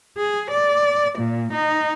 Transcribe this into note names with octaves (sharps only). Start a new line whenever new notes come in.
G#4
D5
A#2
D#4